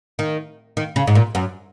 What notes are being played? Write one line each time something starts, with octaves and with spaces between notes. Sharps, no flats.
D#3
D#3
C#3
G#2
A#2
F#2